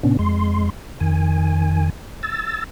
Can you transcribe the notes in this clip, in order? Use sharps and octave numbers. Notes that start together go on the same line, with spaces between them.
A2 C3 B3 C#4 D4
F2 G#3 C6
F2 D#3 G#5
E6 A6